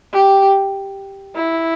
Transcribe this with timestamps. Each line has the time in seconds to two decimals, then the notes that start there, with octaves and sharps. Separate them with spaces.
0.13 G4
1.35 E4